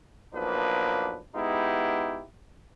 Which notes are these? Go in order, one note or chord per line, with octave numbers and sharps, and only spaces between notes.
B1 F3 A#3 D4 B4
G#3 B3 D#4 E4 G4